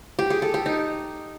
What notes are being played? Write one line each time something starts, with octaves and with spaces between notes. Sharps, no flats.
G4
G#4
A4
G4
D#4